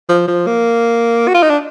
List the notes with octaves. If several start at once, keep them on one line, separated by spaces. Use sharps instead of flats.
F3
F3
A#3
F#4
F4
D#4
D4